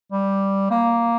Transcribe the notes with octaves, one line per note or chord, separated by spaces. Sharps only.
G3
A#3